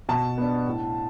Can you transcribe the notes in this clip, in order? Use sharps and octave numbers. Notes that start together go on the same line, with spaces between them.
B2 A5
B3 D4
A2